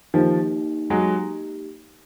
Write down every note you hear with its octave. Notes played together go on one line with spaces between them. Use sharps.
D#3 F3 A#3 D#4 G4
F#3 G#3